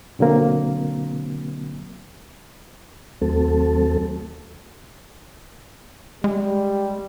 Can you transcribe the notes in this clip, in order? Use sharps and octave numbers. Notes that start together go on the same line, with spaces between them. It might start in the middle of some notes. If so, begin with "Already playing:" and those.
B2 D3 F#3 A#3 C4
D#2 F#3 A3 C4 A4
G3 G#3